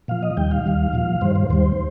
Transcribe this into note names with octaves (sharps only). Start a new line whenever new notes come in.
A#2 F3 F5
D#5
D#2 D#3 G3 G5
F5
D#2 D#3 G3
A#2 F3
G2 D#3 G3 C5
C5
D#2 D#3 G3 C5